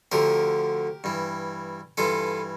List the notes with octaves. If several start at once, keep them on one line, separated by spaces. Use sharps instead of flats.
D2 D3 F3 G4 A#4
G2 E3
G2 E3 F4 A4